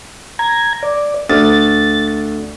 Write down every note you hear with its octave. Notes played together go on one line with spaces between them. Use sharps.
A#5 G#6
D5
D2 A6